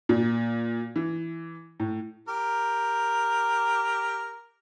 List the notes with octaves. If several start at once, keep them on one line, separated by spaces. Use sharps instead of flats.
A#2
E3
A2
G4 A#4